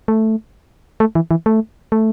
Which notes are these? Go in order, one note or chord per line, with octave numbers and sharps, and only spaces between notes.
A3
A3
E3
E3
A3
A3